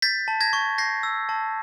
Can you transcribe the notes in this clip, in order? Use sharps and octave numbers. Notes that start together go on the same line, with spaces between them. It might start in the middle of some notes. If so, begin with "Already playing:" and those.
G6 A6 B6
A5
G#6 A#6
C#6
G6 A#6 C7
E6
A5